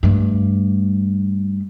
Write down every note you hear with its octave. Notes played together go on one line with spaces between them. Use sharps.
G2 A3